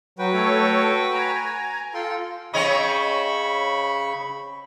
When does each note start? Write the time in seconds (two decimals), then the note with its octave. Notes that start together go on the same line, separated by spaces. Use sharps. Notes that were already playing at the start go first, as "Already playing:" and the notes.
0.19 F#3 F#4 B4 G5
0.33 A3 A4 C#5
1.13 G#5 A#5
1.94 F4 A4 G5 C6
2.54 C#3 C4 C#5 D#5 B5 C#6